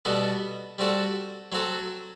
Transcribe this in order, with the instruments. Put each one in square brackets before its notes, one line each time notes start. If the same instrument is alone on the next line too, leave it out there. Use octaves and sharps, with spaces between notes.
[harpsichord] B2 G3 B3 F#4 A4
G3 C4 F#4 A4
F#3 C4 F#4 A4